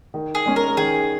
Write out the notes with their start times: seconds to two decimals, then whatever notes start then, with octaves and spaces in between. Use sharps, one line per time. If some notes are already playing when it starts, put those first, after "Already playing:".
0.14 D#3
0.35 G#4
0.46 G#3 C#4
0.56 A#4
0.77 D#3 G#4